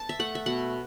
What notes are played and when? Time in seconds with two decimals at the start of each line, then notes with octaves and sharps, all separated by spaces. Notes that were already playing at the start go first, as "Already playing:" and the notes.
Already playing: A5
0.09 E5
0.19 A3 F#5
0.35 E5
0.46 B2 F#5